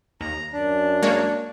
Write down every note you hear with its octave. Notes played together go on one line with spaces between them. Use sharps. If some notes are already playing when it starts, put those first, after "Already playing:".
D#2 A#5
F#2 D4
G#3 A#3 C#5